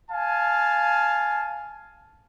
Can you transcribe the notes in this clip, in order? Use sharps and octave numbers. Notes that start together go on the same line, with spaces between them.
F5 G#5 A5